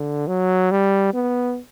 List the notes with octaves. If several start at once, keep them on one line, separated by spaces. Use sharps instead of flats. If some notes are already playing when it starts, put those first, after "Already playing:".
Already playing: D3
F#3
G3
B3